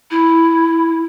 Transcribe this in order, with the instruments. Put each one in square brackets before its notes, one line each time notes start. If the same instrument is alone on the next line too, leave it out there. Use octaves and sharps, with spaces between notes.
[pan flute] E4